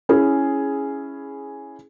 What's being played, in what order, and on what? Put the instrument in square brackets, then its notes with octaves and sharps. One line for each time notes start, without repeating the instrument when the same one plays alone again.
[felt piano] C#4 E4 G#4